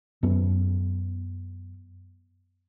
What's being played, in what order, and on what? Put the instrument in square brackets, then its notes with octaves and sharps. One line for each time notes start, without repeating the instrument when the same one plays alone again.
[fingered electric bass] F#2 B3